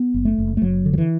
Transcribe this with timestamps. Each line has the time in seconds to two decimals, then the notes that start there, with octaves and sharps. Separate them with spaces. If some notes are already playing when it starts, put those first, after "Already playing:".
Already playing: B3
0.14 F#1
0.25 A3
0.38 F#1
0.57 A3
0.62 F#1 F#3
0.86 D3
0.93 F#3
0.98 E3